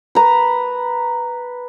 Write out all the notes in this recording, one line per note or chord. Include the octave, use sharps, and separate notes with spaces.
B4 A#5